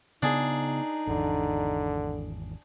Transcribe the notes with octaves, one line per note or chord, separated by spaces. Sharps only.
C#3 B3 D4 D#4 G#4
G#1 E2 D3